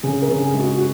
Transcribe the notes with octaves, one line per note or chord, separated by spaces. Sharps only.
C#3 G#4
A#4
C#3
G#4
G#3
F#4
F#4